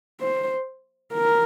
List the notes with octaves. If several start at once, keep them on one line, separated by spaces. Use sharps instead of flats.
C5
A#4